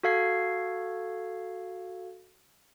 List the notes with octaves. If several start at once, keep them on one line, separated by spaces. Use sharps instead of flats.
F#4 A4 F5 G#6 C7